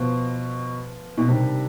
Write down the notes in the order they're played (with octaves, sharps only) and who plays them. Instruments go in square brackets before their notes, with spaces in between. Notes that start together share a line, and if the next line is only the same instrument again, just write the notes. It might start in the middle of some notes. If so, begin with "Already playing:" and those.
Already playing: [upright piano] B2 [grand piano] F3 B3 F4
[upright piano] B2
[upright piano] C3 [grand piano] D#3 G3 D4 G4